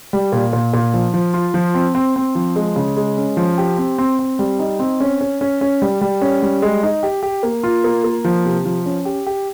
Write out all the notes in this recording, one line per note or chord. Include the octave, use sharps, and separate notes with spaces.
G3
A#2
A#2
A#2
F3
F3
F4
F3
C4
C4
C4
F3
G#3
C#3
G#3
C#4
F3
G4
C4
C4
C4
G3
D#4
C4
C#4
C#4
C#4
C#4
G3
G3
C#4
G3
G#3
D#4
G4
G4
A#3
F4
A#3
A#3
F3
C3
F3
C#4
G4
G4